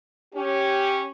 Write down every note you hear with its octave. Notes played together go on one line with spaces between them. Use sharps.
C#4 G4